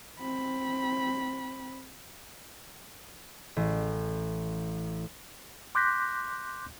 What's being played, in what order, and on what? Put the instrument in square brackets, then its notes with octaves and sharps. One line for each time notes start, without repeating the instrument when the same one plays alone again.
[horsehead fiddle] C4 B5
[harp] A1
[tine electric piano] C6 D6 F#6 G6 A#6 B6